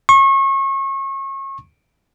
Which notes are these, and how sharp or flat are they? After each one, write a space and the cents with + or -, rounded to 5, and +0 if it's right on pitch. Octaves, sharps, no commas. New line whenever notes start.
C#6 -30